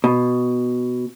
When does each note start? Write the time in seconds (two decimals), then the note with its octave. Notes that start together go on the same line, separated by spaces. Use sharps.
0.04 B2